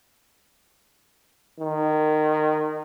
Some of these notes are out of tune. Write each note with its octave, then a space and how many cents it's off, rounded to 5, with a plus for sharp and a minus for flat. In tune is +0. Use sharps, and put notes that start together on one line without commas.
D#3 -20